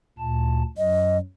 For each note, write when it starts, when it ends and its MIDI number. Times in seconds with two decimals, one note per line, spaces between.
0.19 0.63 38
0.19 0.63 46
0.19 0.63 81
0.78 1.20 42
0.78 1.20 54
0.78 1.17 75